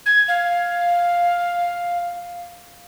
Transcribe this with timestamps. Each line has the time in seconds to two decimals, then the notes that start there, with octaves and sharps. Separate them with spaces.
0.06 G#6
0.28 F5